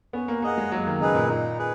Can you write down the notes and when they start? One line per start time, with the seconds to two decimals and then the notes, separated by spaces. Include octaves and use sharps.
0.13 B3 C#4
0.28 A#3
0.42 A#3 G#4 D#5 F#5
0.58 G#3
0.71 F#3 A#3
0.87 D#3
1.00 C#3 D#4 G#4 B4
1.15 A#2
1.29 A#2 D#4
1.59 G#4 B4